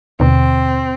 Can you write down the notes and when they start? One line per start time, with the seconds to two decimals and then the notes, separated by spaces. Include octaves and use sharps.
0.20 D#2 B2 D3 C4